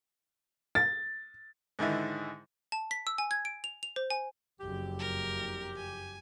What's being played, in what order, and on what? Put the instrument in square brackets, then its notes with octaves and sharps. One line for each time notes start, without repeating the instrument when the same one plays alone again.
[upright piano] A6
[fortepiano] G#2 D3 D#3 E4
[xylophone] A5
B6
E6
G#5
G#6
D7
F7
F7
C5
G#5
[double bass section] F#1 F2 [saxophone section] G4
[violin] A#4
G#5